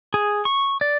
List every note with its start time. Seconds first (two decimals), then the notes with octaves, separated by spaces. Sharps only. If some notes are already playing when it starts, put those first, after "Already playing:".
0.14 G#4
0.45 C#6
0.81 D5